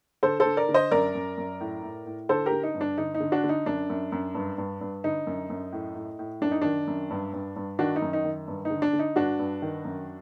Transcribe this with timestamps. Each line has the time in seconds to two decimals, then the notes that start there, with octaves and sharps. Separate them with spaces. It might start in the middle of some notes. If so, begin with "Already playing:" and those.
0.23 D3 A4 C5
0.40 A4 C5
0.46 D3
0.57 A#4 D5
0.69 D3
0.74 C5 D#5
0.91 F#2 A#4 D5
1.15 F#2
1.38 F#2
1.61 A2
1.83 A2
2.06 A2
2.29 D3 A4 C5
2.46 G4 A#4
2.52 D3
2.63 D#4
2.75 G2
2.81 D4
2.98 D3 D#4
3.14 D#4
3.20 D3
3.32 D4 F#4
3.44 D3
3.49 D#4
3.66 F#2 D4
3.90 F#2
4.12 F#2
4.35 G2
4.58 G2
4.81 G2
5.04 D3 D#4
5.27 F#2
5.50 F#2
5.73 A2
5.95 A2
6.19 A2
6.41 F#2 D4
6.51 D#4
6.61 D#3 D4
6.87 F#2
7.10 G2
7.33 G2
7.56 G2
7.79 D#3 D4 F#4
7.96 D#4
8.02 F#2
8.13 D#4
8.25 D#3
8.48 G2
8.65 D#4
8.71 D3
8.82 D4
8.93 D3
8.99 D#4
9.16 G2 D4 F#4
9.39 G2
9.62 D#3
9.85 F#2